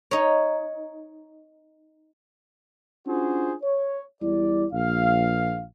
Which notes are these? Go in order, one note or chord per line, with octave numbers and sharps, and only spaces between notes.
D#4 C#5
C#4 D4 F4 F#4 G#4 C5
C#5
E2 G3 E4 D5
A#1 F5